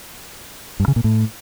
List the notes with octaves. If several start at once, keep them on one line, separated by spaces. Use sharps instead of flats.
G2
C#3
A#2
A2